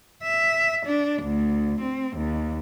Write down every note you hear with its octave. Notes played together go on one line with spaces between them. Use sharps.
E5
D4
D2
C4
D#2